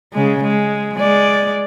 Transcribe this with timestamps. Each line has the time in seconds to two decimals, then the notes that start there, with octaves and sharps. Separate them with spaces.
0.13 C#3 G#3
0.44 G#3
0.95 G#3 D5